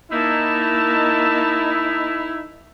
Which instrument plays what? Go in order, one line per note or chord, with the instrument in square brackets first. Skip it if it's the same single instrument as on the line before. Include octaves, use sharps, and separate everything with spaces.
[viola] A#3 A5 [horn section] D#4 E4